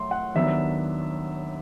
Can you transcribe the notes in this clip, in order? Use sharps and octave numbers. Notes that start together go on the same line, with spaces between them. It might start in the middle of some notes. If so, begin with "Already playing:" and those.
Already playing: A2 F#3 A3 C6
F#5
D#2 D#3 F#3 B3 D4 E5